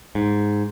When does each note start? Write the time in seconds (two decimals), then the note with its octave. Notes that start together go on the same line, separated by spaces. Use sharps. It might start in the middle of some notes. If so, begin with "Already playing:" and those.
0.15 G#2